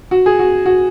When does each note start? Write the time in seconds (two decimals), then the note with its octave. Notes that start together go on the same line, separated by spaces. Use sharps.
0.11 F#4
0.26 G#4
0.39 F#4
0.66 F#4